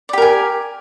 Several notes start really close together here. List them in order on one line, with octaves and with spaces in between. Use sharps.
D5 G4 A#4 G#5